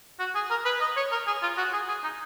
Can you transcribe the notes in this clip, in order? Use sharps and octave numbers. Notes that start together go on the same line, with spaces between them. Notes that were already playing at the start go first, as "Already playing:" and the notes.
F#4
G#4
A#4
B4
D#5
C#5
A#4
G#4
F4
F#4
G#4
G#4
D#4